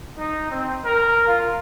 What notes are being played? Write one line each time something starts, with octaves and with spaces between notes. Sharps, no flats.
D#4
C4
A#4
F4